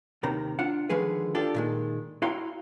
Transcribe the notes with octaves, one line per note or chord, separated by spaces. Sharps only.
D#2 C3 D#3 A#5
D4 F4 F#5
D3 D#3 F3 G#3 G#4 B4
D4 F4 G4 A4
A#2 D#3 G#3
E4 F#4 F5 G5 A#5 C6